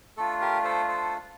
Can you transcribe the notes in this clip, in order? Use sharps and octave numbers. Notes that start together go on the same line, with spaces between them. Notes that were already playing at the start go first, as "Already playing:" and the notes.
A3 D4 F4 A4
G4 A#4
A4 C5
A4 C5